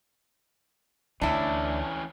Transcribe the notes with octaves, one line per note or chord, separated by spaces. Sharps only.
D2 E3 C#4 D4 E4